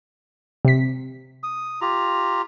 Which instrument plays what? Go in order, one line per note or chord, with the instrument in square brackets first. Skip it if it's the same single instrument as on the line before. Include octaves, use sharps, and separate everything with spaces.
[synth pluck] C3 B6
[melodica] D#6
F4 G4 A#5